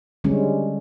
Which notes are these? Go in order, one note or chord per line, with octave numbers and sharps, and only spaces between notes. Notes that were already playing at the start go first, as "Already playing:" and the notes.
D3 G3 G#3 C#4